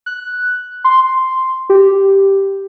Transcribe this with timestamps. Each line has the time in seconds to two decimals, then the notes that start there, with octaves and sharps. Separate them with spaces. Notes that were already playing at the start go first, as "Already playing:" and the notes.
0.06 F#6
0.84 C6
1.70 G4